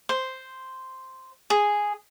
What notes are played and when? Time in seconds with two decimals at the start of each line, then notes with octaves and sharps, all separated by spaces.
0.09 C5
1.50 G#4